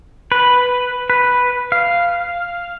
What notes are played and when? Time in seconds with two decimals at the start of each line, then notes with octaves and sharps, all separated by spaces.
0.32 B4
1.10 B4
1.72 F5